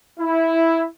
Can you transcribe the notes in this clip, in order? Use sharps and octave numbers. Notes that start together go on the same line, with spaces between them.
E4